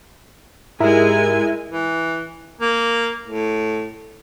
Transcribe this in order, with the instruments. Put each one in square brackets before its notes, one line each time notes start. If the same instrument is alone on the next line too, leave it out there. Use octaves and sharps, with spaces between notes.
[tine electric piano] G#2 G4 [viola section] G#3 G#5 [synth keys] E4 A#4 E5
[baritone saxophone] E3
A#3
A2